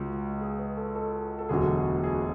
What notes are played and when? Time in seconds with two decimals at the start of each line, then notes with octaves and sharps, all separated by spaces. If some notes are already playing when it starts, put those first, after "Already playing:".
Already playing: C#2 C#3 G#3 F#4
0.41 G#4
0.59 B4
0.77 A4
0.95 A4
1.39 A4
1.49 E1 D2 D3 F#3 G#4
2.04 G#4